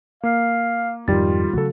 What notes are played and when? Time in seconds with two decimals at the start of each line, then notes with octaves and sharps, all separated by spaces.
0.23 A#3 F5
1.08 F2 G#2 D#3 G3 F4 A6
1.53 C#3 F#3 A3 F#4 A4